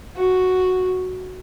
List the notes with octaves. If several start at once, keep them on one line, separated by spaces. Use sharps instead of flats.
F#4